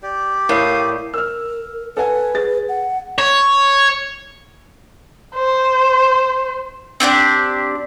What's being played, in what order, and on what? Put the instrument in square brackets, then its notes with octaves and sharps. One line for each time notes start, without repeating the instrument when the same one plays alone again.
[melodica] G4 D5
[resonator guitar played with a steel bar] A2 [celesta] A#4 C#5 [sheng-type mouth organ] F5 D#6
[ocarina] A#4 [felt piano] E6 F6
[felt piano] A4 F#5 G#5 [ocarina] B4
[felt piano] G#4 A6
[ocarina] F#5
[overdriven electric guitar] C#5
[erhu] C5
[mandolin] C4 D4 F4 G4